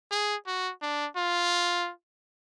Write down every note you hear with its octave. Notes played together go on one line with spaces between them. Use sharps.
G#4
F#4
D4
F4